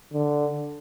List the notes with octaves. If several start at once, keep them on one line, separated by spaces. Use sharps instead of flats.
D3